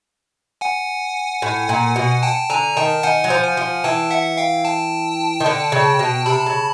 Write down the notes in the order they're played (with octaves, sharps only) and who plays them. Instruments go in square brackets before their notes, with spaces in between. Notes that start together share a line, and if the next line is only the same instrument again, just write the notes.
[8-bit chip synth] F#5 G#5
[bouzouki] A2
A#2
B2
[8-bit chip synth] G5 A5
[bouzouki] D3 [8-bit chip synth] G#5 A#5
[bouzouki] D#3 [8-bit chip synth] G5 A5
[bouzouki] D#3 [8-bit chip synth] F#5 G#5
[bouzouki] F#3
F3
[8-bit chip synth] F#5 G#5
[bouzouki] F3
[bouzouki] E3 [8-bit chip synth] G5 A5
[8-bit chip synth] E5 F#5
F5 G5
G5 A5
[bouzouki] D#3
D3
C#3
B2
[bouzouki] C3 [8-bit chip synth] A5 B5
[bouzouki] C#3